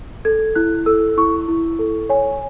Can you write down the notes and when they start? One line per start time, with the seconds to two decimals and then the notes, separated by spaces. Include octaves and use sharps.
0.25 A4 G#6
0.55 E4 F#6
0.86 A4 E6
1.17 E4 C#6
1.48 E4
1.79 A4
2.09 C#5 G#5